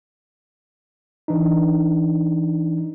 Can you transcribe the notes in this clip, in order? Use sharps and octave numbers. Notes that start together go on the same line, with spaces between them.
E3 D4 D#4